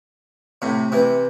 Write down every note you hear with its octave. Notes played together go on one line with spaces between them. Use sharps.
A2 C3
C3 E3